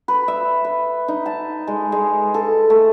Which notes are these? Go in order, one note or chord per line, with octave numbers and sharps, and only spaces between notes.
B4
E5
B4
D#4
A5
G#3
G#3
A4
A3